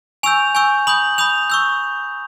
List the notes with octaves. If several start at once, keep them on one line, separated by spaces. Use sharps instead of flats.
G#5 C#6 E6 G6 F7
G#5 C#6 E6 G6
B5 D#6 G6 F#7
B5 D#6 G6 F7
C#6 E6 G6